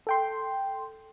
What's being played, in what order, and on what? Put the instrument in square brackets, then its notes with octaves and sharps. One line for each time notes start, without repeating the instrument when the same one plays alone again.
[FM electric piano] A4 G5 C6